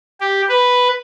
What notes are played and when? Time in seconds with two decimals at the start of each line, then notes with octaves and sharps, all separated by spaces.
0.20 G4
0.49 B4